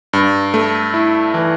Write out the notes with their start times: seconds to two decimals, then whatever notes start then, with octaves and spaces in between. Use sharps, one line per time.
0.13 G2
0.54 A3
0.94 E4
1.34 E3